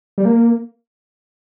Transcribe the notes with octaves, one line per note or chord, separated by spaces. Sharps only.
G3
A#3